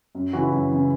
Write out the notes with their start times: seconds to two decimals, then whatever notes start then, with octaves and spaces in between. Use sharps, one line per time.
0.15 F#2
0.33 C#3 E3 F#4
0.42 E4
0.52 F#2 F#4
0.71 C#3 E3